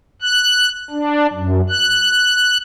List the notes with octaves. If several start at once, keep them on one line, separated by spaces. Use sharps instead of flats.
F#6
D4
F#2
F#6